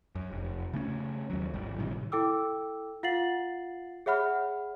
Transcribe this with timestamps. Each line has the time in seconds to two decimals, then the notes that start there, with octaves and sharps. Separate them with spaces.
0.15 F#2
0.31 F1
0.73 C#3 A3 B3 C#4
1.30 D#2 F#3
1.54 G#1 G3
1.78 A2 C3 D#3 E3
2.12 E4 A4 G5 D6 E6
3.03 F4 F5 F#5 A6 C7 F#7
4.06 G#4 C#5 E5 F#5 B5 F6